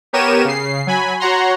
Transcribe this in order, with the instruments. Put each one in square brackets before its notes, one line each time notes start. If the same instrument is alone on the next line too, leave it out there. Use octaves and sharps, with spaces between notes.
[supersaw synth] B3 G4 A#4 C#5 D#7 E7
C#3 C7
F#3 G#5 B5
F#4 C#5 F#5 A#5 C6